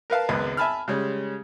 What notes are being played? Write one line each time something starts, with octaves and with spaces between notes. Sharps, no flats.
A#4 B4 F5 A5
G#1 C#2 F#2 B3
E5 G#5 A5 B5 F6
C#3 G3 G#3 C#4